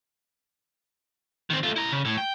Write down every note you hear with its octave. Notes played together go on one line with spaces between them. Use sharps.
D#3 C4
A3 F4
E4 A#5
C#3
A2
G5